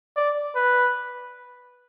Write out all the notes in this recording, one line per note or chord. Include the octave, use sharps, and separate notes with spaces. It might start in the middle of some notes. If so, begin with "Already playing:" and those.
D5
B4